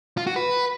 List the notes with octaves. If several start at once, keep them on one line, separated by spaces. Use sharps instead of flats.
F4
F#4
B4